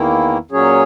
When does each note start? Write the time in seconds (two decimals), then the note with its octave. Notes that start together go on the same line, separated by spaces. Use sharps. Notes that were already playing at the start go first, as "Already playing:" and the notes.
Already playing: E2 D#3 A#3 E4
0.51 A#2 F#3 C#4 G#4 C#5